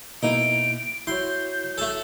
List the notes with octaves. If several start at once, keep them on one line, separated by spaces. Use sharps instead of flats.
B2 A#3 D#4 E4 D7
E4 F#4 C#5 C6 G6
A3 A4